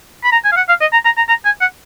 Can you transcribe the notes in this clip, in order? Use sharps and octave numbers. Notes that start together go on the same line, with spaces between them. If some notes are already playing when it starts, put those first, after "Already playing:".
B5
A#5
G#5
F5
F#5
F5
D#5
A#5
A#5
A#5
A#5
G#5
F#5